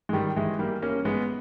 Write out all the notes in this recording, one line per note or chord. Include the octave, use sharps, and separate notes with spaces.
G#3
D#3 G3
E3 G#3
G3 A#3
A#3 C#4
G#3 B3